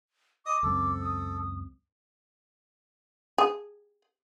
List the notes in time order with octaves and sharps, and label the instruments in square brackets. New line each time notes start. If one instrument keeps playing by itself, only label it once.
[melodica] D#5 D#6 [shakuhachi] D6
[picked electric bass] C#2 F#2 C4 [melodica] A4
[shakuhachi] D#6
[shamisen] G#4